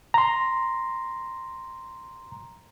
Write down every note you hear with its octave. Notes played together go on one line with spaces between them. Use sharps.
A#5 C6